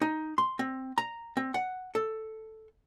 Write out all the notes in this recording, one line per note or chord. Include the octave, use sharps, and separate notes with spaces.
D#4
C6
C4
A#5
C4
F#5
A4